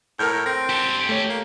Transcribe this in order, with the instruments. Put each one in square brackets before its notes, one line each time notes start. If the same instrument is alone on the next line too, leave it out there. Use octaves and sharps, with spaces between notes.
[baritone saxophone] A2 [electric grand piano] A#4 F6 G6
[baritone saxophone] C4 [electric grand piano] A#6
[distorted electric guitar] G4 A4
[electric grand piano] A3 C#5
[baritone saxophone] A#3